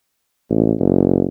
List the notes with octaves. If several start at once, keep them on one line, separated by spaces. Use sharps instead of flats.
A1
F#1